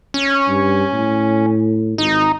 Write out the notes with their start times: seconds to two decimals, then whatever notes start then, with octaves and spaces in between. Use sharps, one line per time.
0.14 C#4
0.48 G2
0.93 A2
1.98 G#1 D#4